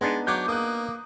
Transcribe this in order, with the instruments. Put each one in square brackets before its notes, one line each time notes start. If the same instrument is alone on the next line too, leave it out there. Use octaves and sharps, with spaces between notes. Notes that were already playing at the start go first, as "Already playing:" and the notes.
[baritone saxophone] G#3 [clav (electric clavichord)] B3 D4 D#4
[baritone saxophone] F#3 [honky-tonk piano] D6 G6
[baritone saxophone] A#3 [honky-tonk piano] D#6 F#6